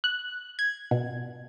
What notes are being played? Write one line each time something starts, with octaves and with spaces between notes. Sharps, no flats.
F#6
G#6
B2